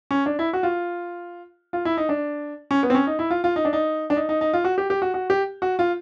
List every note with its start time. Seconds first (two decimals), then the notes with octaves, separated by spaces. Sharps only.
0.11 C#4
0.26 D4
0.39 E4
0.53 F#4
0.63 F4
1.73 F4
1.85 E4
1.97 D#4
2.09 D4
2.71 C#4
2.83 B3
2.90 C4
2.95 C#4
3.07 D#4
3.19 E4
3.30 F4
3.44 F4
3.56 D#4
3.65 D4
3.73 D#4
4.10 D4
4.16 D#4
4.29 D#4
4.41 D#4
4.53 F4
4.64 F#4
4.78 G4
4.90 G4
5.02 F#4
5.14 F#4
5.30 G4
5.62 F#4
5.79 F4